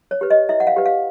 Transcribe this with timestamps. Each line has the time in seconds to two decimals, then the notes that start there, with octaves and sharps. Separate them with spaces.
0.11 C#5
0.21 G4 B4
0.30 D#5
0.49 E4 E5
0.60 F#5
0.67 F5
0.76 G4 B4
0.86 F5